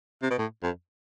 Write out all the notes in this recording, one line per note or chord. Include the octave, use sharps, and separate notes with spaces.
C3
B2
A2
F2